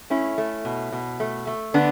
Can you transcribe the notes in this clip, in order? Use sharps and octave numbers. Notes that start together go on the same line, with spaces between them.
A3 C#4 E4
A3
B2
B2
A3
A3
D3 B3 D4